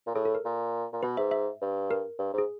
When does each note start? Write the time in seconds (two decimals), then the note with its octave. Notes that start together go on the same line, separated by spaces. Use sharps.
0.07 A#2
0.15 A2 G#4
0.25 A4
0.35 A#4
0.45 A#2
0.93 A#2
1.03 B2 B4
1.17 G#2 E5
1.31 E5
1.62 G2
1.91 A#4
2.19 G2
2.33 G#2 G#4